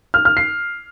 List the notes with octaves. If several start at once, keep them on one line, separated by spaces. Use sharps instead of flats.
F6
F6
C7